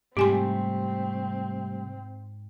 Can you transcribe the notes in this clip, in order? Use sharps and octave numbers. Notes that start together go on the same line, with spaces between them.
G#2 C3 G3 A3 C4 G4 G#5 C6